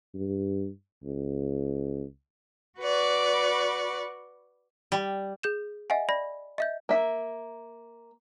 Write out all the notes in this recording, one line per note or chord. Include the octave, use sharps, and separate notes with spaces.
G2
C#2
F#4 B4 D5 C#6
G3
G#4 G6 E7
D#5 E5 F#5 G#5
D5 B5 A#6
D#5 E5 G6
A#3 E5